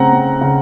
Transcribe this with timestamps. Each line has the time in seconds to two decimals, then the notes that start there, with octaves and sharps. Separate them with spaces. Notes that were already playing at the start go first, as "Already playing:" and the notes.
Already playing: C#3 A3 C4 F#5 A#5
0.13 C4
0.41 C#3